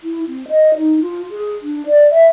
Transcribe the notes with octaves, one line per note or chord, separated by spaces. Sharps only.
E4
C4
D#5
D#4
F4
G#4
D4
D5
E5